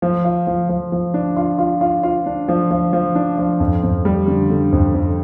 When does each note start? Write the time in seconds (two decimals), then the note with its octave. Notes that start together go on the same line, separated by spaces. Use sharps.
0.02 F3
0.24 F4
0.47 F3
0.69 F3
0.92 F3
1.14 D4
1.37 F4
1.58 F4
1.81 F4
2.03 F4
2.26 D4
2.48 F3
2.71 F3
2.93 F3
3.15 D4
3.38 F3
3.60 F2
3.83 F2
4.05 G3
4.28 D3
4.50 D3
4.72 F2
4.94 F2